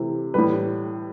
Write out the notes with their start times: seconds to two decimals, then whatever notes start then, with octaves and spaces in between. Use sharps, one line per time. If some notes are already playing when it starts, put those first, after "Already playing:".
Already playing: C3 E3 A3
0.34 A2 E3 G3 B4